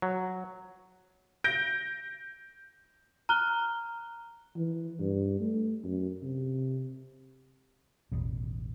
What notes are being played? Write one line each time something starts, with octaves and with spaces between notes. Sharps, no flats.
F#3
G6 A#6 D7
A#5 F6 F#6 G7
E3
G2
A3
F#2
C3
A1 E2 B2